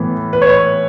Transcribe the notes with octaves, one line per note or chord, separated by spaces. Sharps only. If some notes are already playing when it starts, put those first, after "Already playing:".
Already playing: A2 E3 B3
B4
C#5